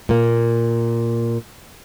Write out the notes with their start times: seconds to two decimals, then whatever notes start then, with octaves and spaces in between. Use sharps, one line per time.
0.09 A#2 A#3